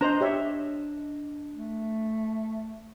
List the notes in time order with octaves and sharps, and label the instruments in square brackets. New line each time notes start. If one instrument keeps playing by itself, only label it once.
[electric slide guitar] D4 D#5 [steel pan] C5 A#5
[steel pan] G4 C#5 E5
[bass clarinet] A3